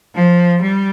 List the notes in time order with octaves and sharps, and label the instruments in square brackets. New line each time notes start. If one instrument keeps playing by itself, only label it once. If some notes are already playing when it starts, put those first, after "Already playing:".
[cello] F3
G3